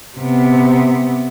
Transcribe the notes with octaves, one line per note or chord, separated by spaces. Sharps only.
C3 B3